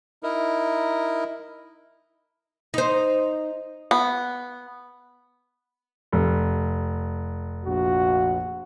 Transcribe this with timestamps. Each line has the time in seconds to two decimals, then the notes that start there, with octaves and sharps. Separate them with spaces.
0.23 D#4 E4 A#4
2.74 D#4 C5
3.91 B3
6.13 F1
7.65 A#1 F#4